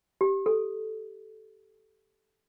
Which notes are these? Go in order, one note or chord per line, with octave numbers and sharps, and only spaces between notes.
G4
A4